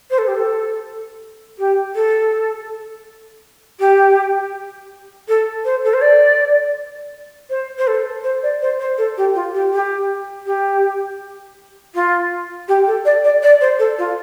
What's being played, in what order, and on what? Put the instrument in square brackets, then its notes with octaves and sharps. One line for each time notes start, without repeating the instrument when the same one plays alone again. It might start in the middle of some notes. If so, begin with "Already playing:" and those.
[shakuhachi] C5
A4
G4
A4
G4
A4
G4
A4
C5
A4
C5
D5
C5
C5
A4
C5
D5
C5
C5
A4
G4
F4
G4
G4
G4
F4
G4
A4
D5
D5
D5
C5
A4
F4